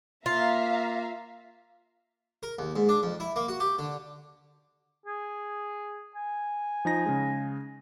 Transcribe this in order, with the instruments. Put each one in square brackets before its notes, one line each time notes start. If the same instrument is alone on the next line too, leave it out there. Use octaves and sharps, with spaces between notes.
[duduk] A#3 [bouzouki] F4 [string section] E5 F5 A#5
[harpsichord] A#4
D#2
G#2
D4
F2
E4
A#3
F#4
G4
D3
[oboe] G#4
G#5
[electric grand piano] F3 D#4 A#6
C#3 G#3